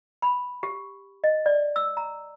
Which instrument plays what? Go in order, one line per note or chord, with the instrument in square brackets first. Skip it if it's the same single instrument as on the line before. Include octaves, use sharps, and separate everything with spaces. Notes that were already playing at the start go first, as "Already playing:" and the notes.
[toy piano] B5
G4
D#5
D5
E6
A#5